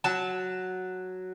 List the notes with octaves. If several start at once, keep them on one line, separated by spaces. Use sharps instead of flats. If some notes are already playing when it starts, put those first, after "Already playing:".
F#3 A5